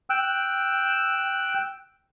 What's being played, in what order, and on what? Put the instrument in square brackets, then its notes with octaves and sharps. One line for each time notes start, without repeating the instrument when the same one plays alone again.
[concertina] G5 E6 F#6